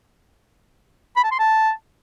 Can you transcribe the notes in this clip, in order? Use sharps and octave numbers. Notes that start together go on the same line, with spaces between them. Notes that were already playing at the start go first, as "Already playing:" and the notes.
B5
A5
C6
A5